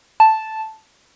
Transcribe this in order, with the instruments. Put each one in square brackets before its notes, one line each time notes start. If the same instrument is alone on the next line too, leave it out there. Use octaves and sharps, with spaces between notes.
[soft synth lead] A5